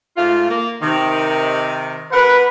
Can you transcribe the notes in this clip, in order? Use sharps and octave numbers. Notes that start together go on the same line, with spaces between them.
G#2 A3 F4
A#3
C3 D#3
G2 A#4 B4 F#5